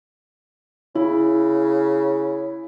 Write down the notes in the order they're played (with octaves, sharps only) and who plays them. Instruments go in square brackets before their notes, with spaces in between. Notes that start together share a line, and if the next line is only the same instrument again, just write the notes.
[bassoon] C#3 [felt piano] E4